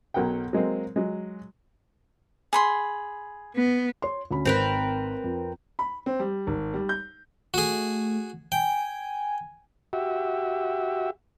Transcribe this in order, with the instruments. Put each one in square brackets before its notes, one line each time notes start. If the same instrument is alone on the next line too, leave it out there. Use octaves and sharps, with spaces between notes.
[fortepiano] B1 F#3 A#4 F#5 G5
F#3 G#3 A#3 C4
F#3 G#3
[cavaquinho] G#4 B5 C6
[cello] B3
[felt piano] C#5 C6
D2 C#4 B5
[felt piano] G#1 [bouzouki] C4 A#4 B4
[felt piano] F2
[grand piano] B5
C4
G3
G#1
G3
G6
[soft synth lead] A3 [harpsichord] F#4 G#4
[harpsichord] G5 [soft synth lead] G#5
[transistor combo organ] F#4 G4 E5